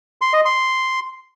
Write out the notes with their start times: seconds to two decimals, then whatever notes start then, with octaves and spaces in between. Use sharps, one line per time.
0.21 C6
0.33 D#5
0.45 C6